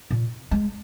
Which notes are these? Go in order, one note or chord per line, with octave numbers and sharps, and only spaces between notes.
A#2
G#3